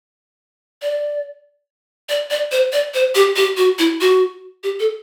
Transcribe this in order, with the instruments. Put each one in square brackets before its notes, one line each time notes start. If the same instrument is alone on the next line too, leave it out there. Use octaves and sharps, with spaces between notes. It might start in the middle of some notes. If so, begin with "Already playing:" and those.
[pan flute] D5
D5
D5
C5
D5
C5
G4
G4
F#4
E4
F#4
G4
A4